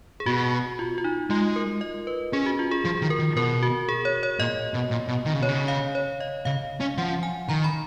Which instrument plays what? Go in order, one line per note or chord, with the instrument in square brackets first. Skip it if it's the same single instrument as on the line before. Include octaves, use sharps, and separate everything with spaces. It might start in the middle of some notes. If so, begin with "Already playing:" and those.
[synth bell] G#4
[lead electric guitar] B2 [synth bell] F#4
[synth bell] F4
F4
D#4
[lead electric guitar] G#3 [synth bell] F4
[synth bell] A#4
D#5
B4
[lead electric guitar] C#4 [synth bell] G#4
[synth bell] F#4
F4
G#4
[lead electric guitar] F3 [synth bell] G#4
[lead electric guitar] D#3
[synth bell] A#4
[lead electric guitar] D#3
[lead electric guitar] B2 [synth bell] A#4
[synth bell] F#4
G#4
C#5
C#5
[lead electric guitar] A#2 [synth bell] D#5
[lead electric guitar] B2
A#2
B2
D#3
C#3
[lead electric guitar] B2 [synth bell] C#5
[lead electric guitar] C#3
[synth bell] F5
C#5
D#5
[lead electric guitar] C#3 [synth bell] F5
[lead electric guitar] C#4
[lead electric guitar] F3 [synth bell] F#5
[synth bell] G#5
[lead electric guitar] D#3 [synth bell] A#5
[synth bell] B5